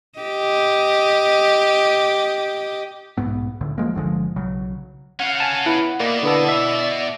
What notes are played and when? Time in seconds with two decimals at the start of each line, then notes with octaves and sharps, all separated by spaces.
0.19 G4 D#5
3.18 B1 G#2 B3
3.61 C#2 A2 D3
3.78 C#2 F3 G#3 A#3
3.95 G1 D3 F3 G#3
4.36 B1 C#3 F#3
5.19 C#4 F5 F#5
5.40 G#5 A5
5.66 B3 E4 F#5
6.00 B2 A#3 D5
6.23 D3 B3 A4
6.49 E5